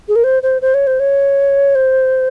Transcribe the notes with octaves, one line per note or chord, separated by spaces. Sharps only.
G#4
A#4
C5
C5
C5
C#5
C5
C#5
C5